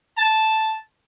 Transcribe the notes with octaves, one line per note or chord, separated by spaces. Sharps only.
A5